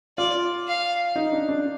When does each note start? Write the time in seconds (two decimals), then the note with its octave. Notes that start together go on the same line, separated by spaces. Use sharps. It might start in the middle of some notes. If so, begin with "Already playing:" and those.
0.18 F4 D5
0.68 F5
1.16 D#4
1.32 D4
1.49 D4